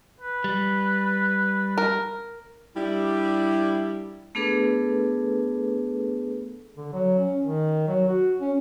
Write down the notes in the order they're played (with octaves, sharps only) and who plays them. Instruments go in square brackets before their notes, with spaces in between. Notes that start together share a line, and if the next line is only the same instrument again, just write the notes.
[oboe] B4
[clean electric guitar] G3
[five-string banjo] A#4
[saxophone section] G3 D4 E4
[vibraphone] A3 B3 D4 G#4 A4 B4
[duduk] D3
F#3
C#4
D#3
F#3
F#4
C#4